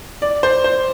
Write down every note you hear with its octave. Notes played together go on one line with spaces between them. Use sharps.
D5
C5
C5